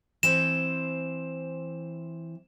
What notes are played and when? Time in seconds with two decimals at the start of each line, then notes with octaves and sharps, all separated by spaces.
0.23 E3 C4 C5 E7